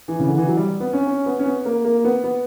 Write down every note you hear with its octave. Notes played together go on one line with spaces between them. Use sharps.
E3
C#3
D3
E3
F#3
G3
B3
C#4
C#4
B3
C#4
B3
A#3
A#3
B3
B3